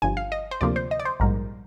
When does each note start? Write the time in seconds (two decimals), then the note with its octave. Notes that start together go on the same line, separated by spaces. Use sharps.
0.02 G1 G2 F3 G#5
0.17 F5
0.32 D#5
0.51 C5
0.61 D2 C3 F3 A#3 D5
0.76 C5
0.91 D#5
1.00 D5
1.05 C5
1.20 A#1 G#2 G3 A#4